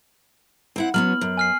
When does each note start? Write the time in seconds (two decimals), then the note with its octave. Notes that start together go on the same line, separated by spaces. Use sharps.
0.76 C4 E4 F#5
0.94 F#3 B3 C#4 F6 F#7
1.21 F#2
1.37 G#5 F6 C7